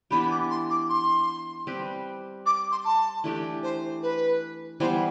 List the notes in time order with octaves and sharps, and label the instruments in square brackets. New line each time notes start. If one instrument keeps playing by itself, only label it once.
[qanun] E3 B3 D4 G4 [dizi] B5
[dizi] D6
C6
D6
C6
[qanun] G3 C4 G4 B4
[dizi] D6
C6
A5
[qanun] E3 A3 D4 G4
[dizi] C5
B4
[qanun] E3 G3 B3 [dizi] C5